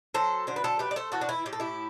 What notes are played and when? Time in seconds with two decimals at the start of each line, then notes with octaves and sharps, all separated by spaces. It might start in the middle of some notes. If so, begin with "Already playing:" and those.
0.14 F#3 A4 C5
0.47 D3 C5
0.56 B4
0.64 A4 C5
0.79 A3 G4 B4
0.91 D5
0.96 A4 C5
1.12 E3 F#4 A4
1.21 D4
1.29 E4
1.46 A2 G4
1.53 A4
1.60 E4 G4